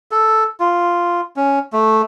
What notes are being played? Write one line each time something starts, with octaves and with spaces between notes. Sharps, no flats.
A4
F4
C#4
A3